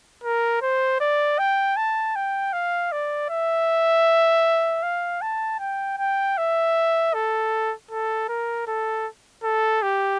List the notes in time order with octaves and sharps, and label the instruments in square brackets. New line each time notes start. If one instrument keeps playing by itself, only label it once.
[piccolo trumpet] A#4
C5
D5
G5
A5
G5
F5
D5
E5
F5
A5
G5
G5
E5
A4
A4
A#4
A4
A4
G4